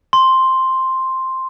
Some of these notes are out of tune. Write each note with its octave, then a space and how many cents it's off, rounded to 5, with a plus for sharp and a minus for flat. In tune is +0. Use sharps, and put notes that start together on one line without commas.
C6 +5